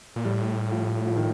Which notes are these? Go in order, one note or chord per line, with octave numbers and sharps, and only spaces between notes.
A#2
A2 G3
F3
F3
D#3